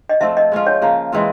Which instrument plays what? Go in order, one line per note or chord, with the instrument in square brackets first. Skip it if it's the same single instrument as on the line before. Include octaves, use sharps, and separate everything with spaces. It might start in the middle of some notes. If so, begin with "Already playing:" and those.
[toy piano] D#5
[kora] F3 A3 C4 [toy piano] E5
[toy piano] D#5
[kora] G#3 C#4 F4
[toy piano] C#5
[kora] C#3 F3 A#3
E3 G#3 C4 F4